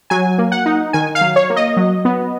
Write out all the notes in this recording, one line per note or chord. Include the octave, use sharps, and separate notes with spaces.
F#3 G#5
A#3
F#5
D#4
D#3 G#5
F5
F#3
C#5
A#3
D#5
F#3
B3